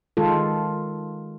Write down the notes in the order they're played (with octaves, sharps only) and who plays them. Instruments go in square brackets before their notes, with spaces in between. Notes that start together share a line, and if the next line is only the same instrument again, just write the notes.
[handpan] D#3 G#3 F4 A4